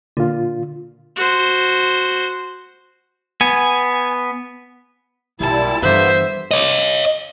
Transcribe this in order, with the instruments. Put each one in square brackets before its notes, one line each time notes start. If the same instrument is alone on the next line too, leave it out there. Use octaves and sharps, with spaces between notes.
[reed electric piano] A#2 F4 [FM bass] D3
[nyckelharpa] F#4 C5
[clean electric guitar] B3 [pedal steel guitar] G#5
[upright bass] B1 F#2 [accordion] A#2 G3 E4 [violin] A5
[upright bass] G2 E3 [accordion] D3 A#3 B3 [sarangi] C5 [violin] E5
[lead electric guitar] C#5 D#5